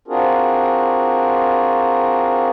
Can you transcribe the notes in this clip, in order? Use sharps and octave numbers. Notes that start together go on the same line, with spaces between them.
C4 D4 F4 F#4 G#4 A#4